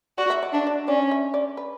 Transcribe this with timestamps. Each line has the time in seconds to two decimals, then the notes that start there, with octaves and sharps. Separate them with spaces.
0.18 F#4 D5
0.30 E5
0.43 D5
0.53 D4 E5
0.67 D5
0.88 C#4 D5
1.11 E5
1.34 D5
1.57 B4